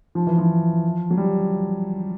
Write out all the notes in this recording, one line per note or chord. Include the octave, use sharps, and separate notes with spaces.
F3
E3
F3
F#3
G3